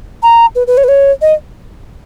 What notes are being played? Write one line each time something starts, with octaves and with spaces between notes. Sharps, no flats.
A#5
B4
B4
C#5
B4
C#5
D#5